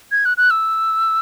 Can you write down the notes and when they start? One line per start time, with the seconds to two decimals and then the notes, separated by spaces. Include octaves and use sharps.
0.12 G#6
0.25 F#6
0.37 F#6
0.50 E6